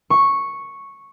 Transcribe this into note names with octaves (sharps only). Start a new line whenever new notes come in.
C#6